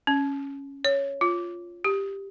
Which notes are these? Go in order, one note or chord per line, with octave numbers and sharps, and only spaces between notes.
C#4
C#5
F4
G4